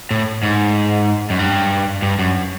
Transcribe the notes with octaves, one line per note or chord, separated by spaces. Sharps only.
A2
G#2
F#2
G2
G2
F#2